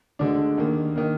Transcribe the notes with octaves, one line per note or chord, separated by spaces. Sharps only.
D2 D3 G#3 D4
D#2 D#3 A#3
D#3 A#3